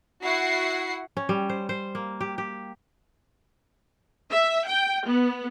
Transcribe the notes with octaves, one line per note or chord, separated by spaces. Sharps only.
E4 F#4 F#5 C7
C#4
G3
C5
C5
A#3
G4
G4
E5
G5
B3